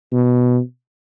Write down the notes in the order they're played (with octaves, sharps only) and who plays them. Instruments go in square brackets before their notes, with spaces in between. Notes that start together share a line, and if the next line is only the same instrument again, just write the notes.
[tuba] B2